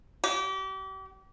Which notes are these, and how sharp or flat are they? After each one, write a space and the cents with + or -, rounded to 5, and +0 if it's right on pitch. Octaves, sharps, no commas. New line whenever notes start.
G4 -35